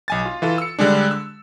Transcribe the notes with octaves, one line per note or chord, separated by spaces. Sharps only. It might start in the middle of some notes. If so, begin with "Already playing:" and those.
B1 G#5 A6
F4
E3 F4 A4
E6 C#7
D3 G3 G#3 D4
E6